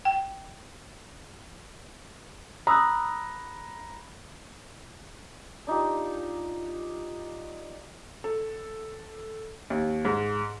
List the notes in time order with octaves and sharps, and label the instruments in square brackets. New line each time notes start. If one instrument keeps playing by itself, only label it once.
[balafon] G5
[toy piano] C5 D#6 E6 [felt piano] A#5 [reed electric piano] B5 F#6
[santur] D4 D#4 F4 G4
[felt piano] A4
D#2
G#2